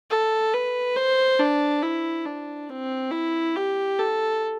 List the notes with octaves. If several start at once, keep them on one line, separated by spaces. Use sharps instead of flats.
A4
B4
C5
D4
E4
D4
C4
E4
G4
A4